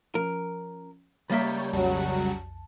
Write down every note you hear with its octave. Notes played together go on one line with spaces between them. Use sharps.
F3 C#4 A#4
C#2 G3 A#3 C#5 E5 G6 A6
B1 F2 C#3 F#3 G3 F#4 A5